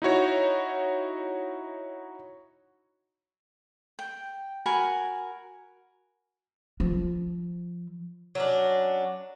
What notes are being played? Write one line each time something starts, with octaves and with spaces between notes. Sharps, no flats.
D#4 E4 F#4 C#5
G5
F#4 A#4 G#5 B5
F3
F#3 C#4 D4